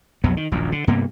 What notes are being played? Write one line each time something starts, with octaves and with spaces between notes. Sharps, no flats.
B1 F2 F#3 B3
D#3
D#1 A#1 F#2
D3
G2 C3 A#3 B3